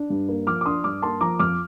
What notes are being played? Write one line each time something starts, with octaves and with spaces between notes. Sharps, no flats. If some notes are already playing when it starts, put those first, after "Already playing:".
Already playing: D4
G2
A#3
F3 D6 F6
D6
D4 C6 D#6
G2 D6 F6
A#3 A5 C6
F3 A#5 D6
F2 D6 F6